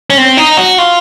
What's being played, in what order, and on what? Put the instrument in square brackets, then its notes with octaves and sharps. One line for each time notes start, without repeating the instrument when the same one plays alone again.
[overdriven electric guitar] C#4
C4
D#4
F#4
F4